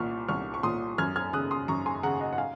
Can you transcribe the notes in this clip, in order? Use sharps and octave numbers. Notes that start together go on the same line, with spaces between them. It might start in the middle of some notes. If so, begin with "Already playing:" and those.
Already playing: C2 A#2 C#6 F6
C2 C#6 F6
C#6
A#2 C6 D#6
F#2 F6 G#6
F6 G#6
C#3 D#6 F#6
C6 D#6
F#2 A#5 C#6
G#5 C6
C#3 F#5 A#5
D#5 F#5
F#5
F5 G#5